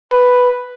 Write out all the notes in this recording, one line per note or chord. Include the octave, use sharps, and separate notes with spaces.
B4